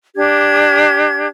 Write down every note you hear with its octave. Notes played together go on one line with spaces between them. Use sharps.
D4 G4 G#6